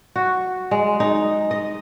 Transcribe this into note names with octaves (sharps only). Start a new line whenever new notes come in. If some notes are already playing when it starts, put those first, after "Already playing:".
F#4
G#3
D#4
D#5